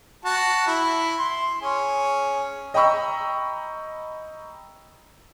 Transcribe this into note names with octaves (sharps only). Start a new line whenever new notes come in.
F#4 A5
E4
C6
C#4 G#4
D#5 G5 A#5 B5 C#6 E6